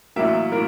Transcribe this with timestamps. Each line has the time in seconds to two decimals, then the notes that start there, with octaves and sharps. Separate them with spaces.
0.16 A1 A2 F#3 A#3 E5
0.52 A2 F#3 A#3 A#4